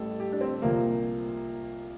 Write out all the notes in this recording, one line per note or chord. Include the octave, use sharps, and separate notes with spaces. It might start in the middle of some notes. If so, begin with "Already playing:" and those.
Already playing: A1 A2 G3 A4
G4
D4
C4
C2 A#2 F3 A#3